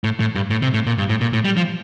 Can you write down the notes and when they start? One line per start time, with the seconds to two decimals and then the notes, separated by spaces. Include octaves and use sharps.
0.04 A2
0.20 A2
0.35 G2
0.50 A2
0.62 C3
0.74 A2
0.87 A#2
0.98 G2
1.09 A2
1.21 A#2
1.33 A2
1.45 G3
1.57 F3